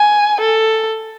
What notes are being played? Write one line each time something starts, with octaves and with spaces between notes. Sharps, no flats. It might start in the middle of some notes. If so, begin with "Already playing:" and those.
Already playing: G#5
A4